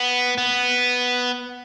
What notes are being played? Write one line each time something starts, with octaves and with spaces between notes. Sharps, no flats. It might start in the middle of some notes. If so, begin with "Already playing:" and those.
Already playing: B3
B3